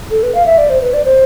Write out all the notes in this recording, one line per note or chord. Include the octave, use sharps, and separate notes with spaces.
A4
B4
F5
E5
D5
C5
B4
D5
C5